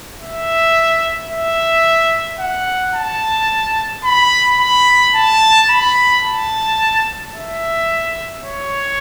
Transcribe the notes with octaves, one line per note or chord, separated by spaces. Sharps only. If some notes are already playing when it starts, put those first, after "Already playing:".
E5
E5
F#5
A5
B5
B5
A5
B5
A5
E5
C#5